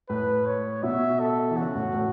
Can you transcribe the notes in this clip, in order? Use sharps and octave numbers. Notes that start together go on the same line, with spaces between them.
A2 B4
C#5
B2 E5
A4
E3
C#3 F#4
A2
A2